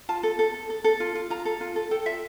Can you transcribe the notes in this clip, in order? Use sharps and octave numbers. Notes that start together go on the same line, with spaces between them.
F4 A5
A4
A4
A4
A4
A4
F4
F4
F4 A#5
A4
F4
A4
A4 G5
F4 E5